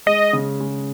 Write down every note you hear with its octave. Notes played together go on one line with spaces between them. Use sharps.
G#3 D#5
C#3
G#3